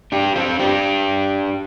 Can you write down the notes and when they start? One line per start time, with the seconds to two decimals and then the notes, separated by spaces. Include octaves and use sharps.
0.12 D4 G4
0.36 C4 F4
0.59 D4 G4